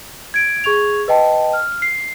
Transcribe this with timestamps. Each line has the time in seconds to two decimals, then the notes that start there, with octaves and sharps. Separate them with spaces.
0.34 G#6 D7
0.64 G#4 C#6 G#6 F7
1.08 B4 D#5 G5 A5
1.53 F6
1.82 C7